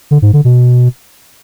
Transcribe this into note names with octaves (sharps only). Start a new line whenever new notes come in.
D3
G#2
D3
B2